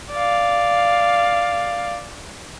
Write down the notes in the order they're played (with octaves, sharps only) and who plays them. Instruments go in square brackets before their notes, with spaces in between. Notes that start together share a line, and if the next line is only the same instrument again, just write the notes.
[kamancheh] D5 F5